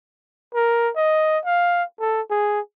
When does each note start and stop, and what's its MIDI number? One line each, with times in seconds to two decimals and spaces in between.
0.55 0.90 70
0.96 1.38 75
1.45 1.83 77
2.00 2.21 69
2.30 2.60 68